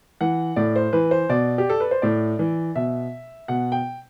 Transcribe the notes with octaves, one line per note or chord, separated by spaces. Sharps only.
E3 F#5
A2 D5
C5
E3 B4
C5
B2 D5
G4
A4
B4
C5
A2 D5
E3
B2 E5
B2 F#5
G5